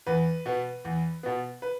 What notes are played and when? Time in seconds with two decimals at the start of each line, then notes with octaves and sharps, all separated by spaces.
0.07 E2 B4
0.46 B2 B3
0.85 E2
1.23 B2 B3
1.62 B4